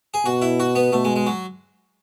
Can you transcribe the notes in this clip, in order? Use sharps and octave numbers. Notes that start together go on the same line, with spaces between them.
G#4
B2 F#4
E4
F#4
B3
B2 A3
G#3
G#3
F#3